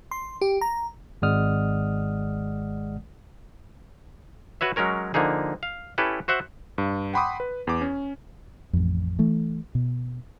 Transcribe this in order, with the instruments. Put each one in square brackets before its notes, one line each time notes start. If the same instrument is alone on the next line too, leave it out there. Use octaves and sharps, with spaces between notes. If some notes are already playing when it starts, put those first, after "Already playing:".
[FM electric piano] C6
G4
A#5
[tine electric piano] G#1 G#3 D5 F#5 D#6 F6
[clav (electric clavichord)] F#4 B4 C#5 E5
F#3 G#3 C#4 A#4 C#5
D3 F3 A#3 D#4 G#4
F5
C#4 E4 G4 A4 B4
F#4 C5 E5 F#5
[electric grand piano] G2
F#5 G5 B5 C6 D6 D#6
B4
E2 D6
C#4
[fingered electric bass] A1 F2
E3 A3
B2